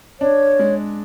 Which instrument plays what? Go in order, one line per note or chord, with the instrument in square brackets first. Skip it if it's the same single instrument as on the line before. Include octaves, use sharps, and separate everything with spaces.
[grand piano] D4 [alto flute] C#5
[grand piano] G#3